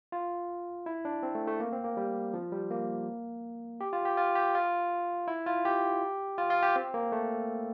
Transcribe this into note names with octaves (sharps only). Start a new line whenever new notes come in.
F4
E4
D4
C4
A3
A3
A#3
C4
A#3
G3
F3
G3
A#3
G4
F4
G4
F4
G4
F4
E4
F4
G4
F4
F4
G4
C4
A#3
A3